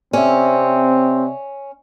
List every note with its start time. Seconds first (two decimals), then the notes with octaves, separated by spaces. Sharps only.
0.13 C3 C4 C#4 D5 E5